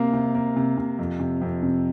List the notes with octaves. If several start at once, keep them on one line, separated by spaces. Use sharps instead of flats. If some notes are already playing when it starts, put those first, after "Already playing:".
Already playing: C3 A#3 F5
C3
A#3
C3
C3
F2
C3
F2
C3